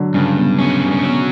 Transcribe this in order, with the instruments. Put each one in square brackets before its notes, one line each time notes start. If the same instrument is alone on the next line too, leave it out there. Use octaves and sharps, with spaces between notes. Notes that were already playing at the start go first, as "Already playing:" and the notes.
Already playing: [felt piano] D3 F#3
[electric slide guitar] G2 [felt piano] C#3
[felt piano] B2
[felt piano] C#3 [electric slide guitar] C#4
[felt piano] D3
[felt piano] B2 [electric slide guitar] F#3